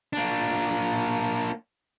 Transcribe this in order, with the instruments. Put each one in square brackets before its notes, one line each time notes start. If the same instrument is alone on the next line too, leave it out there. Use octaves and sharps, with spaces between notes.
[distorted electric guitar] A#3 D4